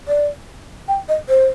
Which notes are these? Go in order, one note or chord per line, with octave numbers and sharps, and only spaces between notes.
D5
G5
D#5
C5